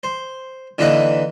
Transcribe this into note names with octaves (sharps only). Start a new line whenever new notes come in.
C5
D3 E3 A#3 D#4 B4